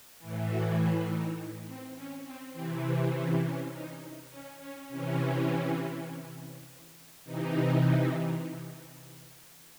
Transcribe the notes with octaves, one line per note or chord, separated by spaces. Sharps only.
A2 E3
F#4
E4
D#4
C4
C#4
C4
C3 E3 C4
C4
C#4
C#4
D#4
C#4
C#4
C3 E3 C#4
C3 E3 D#4